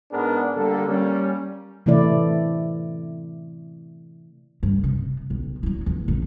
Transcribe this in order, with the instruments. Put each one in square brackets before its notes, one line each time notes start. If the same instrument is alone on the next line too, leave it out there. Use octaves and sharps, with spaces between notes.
[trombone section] G#2 B3 D4 G#4 A#4 B4
D3 G3 A#3 A4
G3 A#3 C#4
[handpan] C3 E3 A3 E4 D5
[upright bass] G2
C3
B1
F#3 E4
E2
A#1 A3